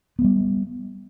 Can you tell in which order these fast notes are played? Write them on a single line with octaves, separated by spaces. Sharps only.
B3 G#3 G3